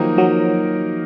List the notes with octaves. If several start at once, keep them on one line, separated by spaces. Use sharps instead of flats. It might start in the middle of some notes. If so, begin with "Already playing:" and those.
Already playing: D#3 F3 F#3 A#3 D#4 F#4 A#4
F#3